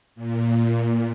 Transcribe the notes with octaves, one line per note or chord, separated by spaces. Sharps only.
A#2